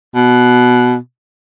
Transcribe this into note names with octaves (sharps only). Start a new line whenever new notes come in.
B2